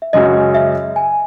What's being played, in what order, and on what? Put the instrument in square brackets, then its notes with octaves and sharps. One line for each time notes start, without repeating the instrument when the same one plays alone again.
[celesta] E5
[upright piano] F#2 C#3 G#3 C#4 F#4 [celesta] D#5
[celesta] E5
G#5